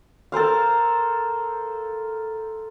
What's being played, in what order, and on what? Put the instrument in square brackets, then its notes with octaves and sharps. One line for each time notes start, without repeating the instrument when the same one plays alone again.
[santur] A4 A#4 C5 F5